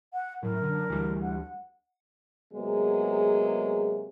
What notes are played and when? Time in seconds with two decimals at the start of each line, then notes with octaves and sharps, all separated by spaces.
0.13 F#5
0.43 F#2 A2 A#4
0.62 D3
0.90 D2 E3 G3
1.22 F#5
2.53 C3 F#3 G#3 A#3 B3 G#4